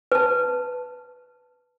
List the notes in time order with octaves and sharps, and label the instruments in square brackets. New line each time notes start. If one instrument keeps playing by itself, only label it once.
[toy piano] B4 A5